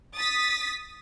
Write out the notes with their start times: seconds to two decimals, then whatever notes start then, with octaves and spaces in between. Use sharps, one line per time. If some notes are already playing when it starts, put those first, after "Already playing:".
0.18 D#6 A6 B6